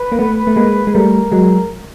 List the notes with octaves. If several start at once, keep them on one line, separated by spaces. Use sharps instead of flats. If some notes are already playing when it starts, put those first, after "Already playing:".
Already playing: B4
A#3
A3 B3
A3
G#3 A#3
G#3
G3 A3 A#4
F#3 G#3